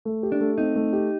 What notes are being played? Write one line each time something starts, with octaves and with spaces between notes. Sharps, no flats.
A3
G4
D4
A3
C4 D#4
A3
G4